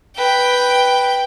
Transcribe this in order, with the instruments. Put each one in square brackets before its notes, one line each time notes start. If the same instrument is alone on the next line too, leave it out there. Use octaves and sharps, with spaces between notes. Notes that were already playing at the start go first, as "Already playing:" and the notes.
[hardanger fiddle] B4 [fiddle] G5